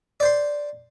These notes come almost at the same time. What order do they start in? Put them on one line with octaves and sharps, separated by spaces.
D5 C5 C6